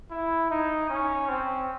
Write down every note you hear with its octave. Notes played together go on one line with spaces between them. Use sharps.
E4
D#4
C#4
C4